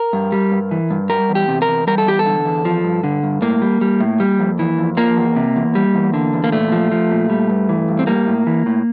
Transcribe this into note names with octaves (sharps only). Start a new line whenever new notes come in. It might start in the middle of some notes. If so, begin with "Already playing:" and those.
Already playing: A#4
G2
G3
G2
E3
G2
G3 A#4
E2
G4
C3
A#4
E2
G3 A#4
A4
E2 G4
A4
D3
E2
F3
G2
D3
G2
A2 A#3
G3
G3
A2
G3
F2
E3
F2
F3 A#3
E2
C3
E2
G3
E2
D3
E2
A#3
A#2 A3
F3
F3
A#2
G3
G2
E3
G2
C4
G3 A#3
A2
E3
A2